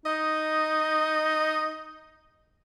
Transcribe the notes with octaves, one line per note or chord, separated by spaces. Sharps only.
D#4 D#5